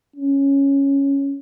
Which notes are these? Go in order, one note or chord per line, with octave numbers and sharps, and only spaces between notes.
C#4